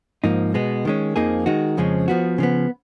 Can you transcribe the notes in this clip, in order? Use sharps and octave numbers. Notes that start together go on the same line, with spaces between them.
G#2 F3 A#3 D#4
B2 G#3 B3
D#3 G#3 C#4
F2 F3 A#3 D#4 G#4
D#3 G#3 D#4 F#4
F2 C#3 F3 G#3 C#4
F3 B3 F#4
C#3 F3 B3